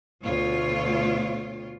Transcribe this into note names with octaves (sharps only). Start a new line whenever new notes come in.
D2 B2 F4 C#5